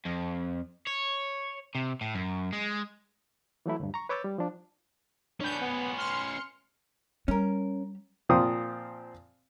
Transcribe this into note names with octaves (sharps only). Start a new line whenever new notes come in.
F2
C#5
C3
A2
F#2
G#3
E3 F#3 A3 E4
D2 G2
A#5 C#6
B4 C#5 D6 E6 G6 A6
G3
F3 D4
C#4 D4 B4 G6
B3
C6 F6 C#7
G3 C#4 A#4
A#2 F3 C4 D#6